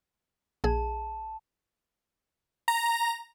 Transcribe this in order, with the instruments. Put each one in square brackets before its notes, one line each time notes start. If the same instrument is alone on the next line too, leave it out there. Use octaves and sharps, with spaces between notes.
[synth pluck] A#1 G#4 [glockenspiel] A5
[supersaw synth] A#5